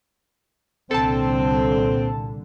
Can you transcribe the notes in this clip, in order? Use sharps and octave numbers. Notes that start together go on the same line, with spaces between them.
C2 A#2 D3 C4 A4 A5